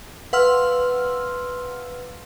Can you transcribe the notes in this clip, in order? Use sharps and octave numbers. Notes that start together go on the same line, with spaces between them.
B4 F5 F#5 C6 E6 F6